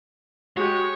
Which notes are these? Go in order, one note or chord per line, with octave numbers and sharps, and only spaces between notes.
G#3 F#4 G4 C#5